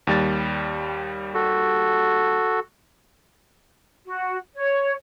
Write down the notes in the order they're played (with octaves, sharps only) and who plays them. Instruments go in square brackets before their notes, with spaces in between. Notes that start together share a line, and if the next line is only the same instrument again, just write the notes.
[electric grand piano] D#2 G3 A6
[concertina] F#4 A4
[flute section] F#4
C#5